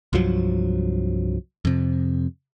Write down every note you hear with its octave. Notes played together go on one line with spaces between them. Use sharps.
C2 G2 F3 F#3
F2 C3